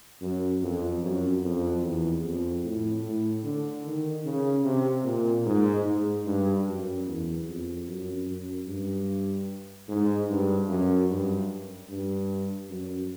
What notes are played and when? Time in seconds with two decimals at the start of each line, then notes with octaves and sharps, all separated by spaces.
0.21 F#2
0.62 F2
1.03 F#2
1.43 F2
1.82 E2
2.23 F2
2.63 A2
3.03 A2
3.43 D3
3.85 D#3
4.25 C#3
4.64 C3
5.04 A#2
5.46 G#2
5.86 G#2
6.25 G2
6.66 F#2
7.06 E2
7.46 F2
7.87 F#2
8.27 F#2
8.67 G2
9.89 G#2
10.29 G2
10.69 F#2
11.10 G2
11.89 G2
12.70 F#2